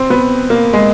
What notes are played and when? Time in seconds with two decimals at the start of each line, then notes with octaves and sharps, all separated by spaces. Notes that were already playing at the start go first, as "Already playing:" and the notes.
Already playing: C4
0.10 B3
0.50 A#3
0.73 G#3